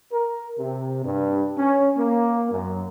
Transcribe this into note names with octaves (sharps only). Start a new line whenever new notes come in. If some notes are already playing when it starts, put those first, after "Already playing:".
A#4
C3
G2
C#4
A#3
F#2